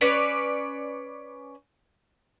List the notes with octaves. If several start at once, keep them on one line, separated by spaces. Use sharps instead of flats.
C#4 B4 C#5 D5